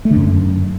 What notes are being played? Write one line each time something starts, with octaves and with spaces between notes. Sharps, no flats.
A3
D3
F#2